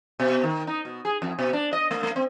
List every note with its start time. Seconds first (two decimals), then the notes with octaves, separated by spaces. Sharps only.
0.20 B2
0.44 D#3
0.67 D#4
0.85 B2
1.05 G#4
1.22 F2
1.39 B2
1.53 D4
1.73 D#5
1.91 A3
2.03 A3
2.16 C4